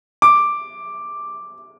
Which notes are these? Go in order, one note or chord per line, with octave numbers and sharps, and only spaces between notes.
D6